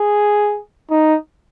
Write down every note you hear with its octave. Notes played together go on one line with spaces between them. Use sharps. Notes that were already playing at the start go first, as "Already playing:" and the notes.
Already playing: G#4
D#4